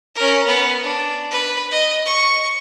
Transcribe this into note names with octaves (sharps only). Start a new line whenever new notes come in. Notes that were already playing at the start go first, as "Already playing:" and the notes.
C#4 A#4
B3
D4
B4
D#5
C#6